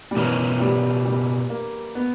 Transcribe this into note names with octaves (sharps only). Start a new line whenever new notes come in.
G3
B2 E3 A#3 C#4
G3
G3
A#3
B3